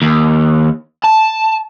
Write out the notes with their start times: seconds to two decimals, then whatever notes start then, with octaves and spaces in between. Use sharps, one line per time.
0.02 D#2
1.04 A5